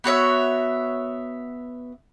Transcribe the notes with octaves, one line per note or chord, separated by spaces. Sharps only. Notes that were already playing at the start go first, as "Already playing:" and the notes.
B3 F#4 C#5 E5